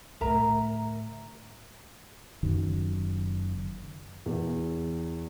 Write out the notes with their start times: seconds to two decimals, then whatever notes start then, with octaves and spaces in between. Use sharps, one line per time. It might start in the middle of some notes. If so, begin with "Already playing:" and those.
0.21 A2 D3 A#4 E5 A#5
2.43 F#1 F#2 D#3 F#3
4.26 E2